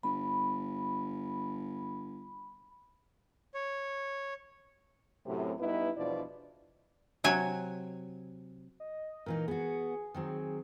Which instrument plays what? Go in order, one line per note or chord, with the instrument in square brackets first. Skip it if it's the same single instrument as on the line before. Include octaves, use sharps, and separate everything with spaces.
[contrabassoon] G1 [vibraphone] B5
[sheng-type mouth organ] C#5
[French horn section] F#2 A2 C3
G2 G3 B3 D#4 E4 B4
E2 B2 F3 D4 E4 D5
[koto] C3 F#3 G#5
[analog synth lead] D#5
[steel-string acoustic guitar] A#2 E3 D#4 [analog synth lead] A#4
[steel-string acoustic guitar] B3 F#4 [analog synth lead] G#4
[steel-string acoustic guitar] D#3 F#3 C4